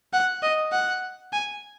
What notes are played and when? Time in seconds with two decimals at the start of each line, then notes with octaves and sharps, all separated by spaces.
0.13 F#5
0.43 D#5
0.72 F#5
1.33 G#5